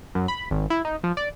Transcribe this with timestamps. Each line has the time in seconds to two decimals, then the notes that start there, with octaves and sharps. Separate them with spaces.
0.15 F#2
0.28 B5
0.51 G#1
0.70 E4
0.85 D#4
1.04 F3
1.17 D5